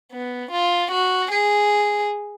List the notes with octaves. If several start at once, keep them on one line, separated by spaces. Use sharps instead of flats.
B3
F4
F#4
G#4